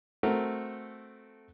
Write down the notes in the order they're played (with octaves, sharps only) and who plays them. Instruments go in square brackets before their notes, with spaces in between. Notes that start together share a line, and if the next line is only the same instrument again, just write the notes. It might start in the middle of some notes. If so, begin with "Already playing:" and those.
[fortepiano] A3 C4 F#4 A4 A#4